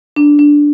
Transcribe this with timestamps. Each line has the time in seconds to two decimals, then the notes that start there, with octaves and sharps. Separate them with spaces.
0.16 D4
0.39 D4